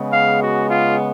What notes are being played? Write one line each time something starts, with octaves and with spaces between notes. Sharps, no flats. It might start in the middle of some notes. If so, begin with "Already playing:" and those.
Already playing: C#3 G#3 B3
F5
F#4
F4